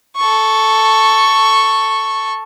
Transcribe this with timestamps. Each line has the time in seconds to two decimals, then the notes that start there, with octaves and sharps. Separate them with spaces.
0.16 A4 C#6